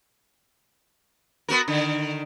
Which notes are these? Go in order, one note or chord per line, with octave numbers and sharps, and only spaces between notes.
B3 F#4 A#4
D3 D#3